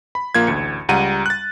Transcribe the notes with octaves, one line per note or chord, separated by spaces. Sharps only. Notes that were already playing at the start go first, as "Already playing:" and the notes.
B5
A#1 A#3 F4 G#6
A1 D2 C#7
C#2 G3 F#5 A#5 D#7
F#6 A6